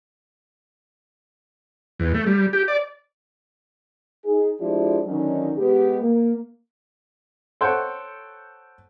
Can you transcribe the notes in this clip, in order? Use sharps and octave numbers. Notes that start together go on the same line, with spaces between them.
E2
A3
G3
G4
D5
D#4 G#4
F3 G#3 D4 E4 F4 G4
D3 D#3 F#3 C#4 D#4
B2 G#3 B3 G4
A#3
A4 C5 C#5 F#5 G5